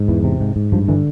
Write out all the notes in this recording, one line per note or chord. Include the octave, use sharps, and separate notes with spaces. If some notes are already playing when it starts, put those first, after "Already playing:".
Already playing: G#2
E2 E3
C3
G#2
G#2
G2 F3
D3 E3